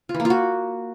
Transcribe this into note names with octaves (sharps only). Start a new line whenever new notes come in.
F4
E3
A#3
F4
F#4